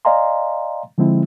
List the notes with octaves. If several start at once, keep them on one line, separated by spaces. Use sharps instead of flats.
D5 D#5 F5 G#5 A#5 C6
D3 F3 G#3 C4 E4